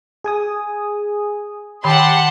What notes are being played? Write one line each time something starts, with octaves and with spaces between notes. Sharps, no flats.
G#4 G#5 D#6
D#3 G4 F#5 A5 B5 C6